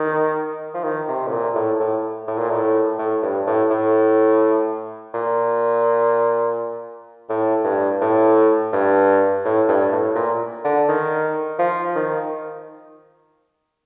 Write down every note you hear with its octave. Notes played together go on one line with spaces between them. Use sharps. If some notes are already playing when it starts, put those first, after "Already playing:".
Already playing: D#3
F3
D#3
C3
A2
A#2
A2
A2
A2
A#2
A2
A2
G2
A2
A2
A#2
A2
G2
A2
G2
A2
G2
A2
A#2
D3
D#3
F3
D#3